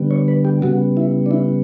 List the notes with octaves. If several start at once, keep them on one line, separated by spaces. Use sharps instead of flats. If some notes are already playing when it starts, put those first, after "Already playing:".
Already playing: D3 G3 B3
C#5
B4
G4
C#3 G3 B3 F#4
E4
D4
E4